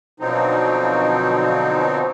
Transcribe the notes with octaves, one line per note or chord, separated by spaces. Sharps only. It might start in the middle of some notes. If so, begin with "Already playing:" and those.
B2 D3 F3 F#3 C4 D#4